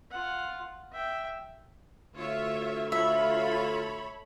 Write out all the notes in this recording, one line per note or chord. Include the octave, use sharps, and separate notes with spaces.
F4 F#5
E5 G5
D2 F4 C#5 E5
F4 A4 C#5 E5 B5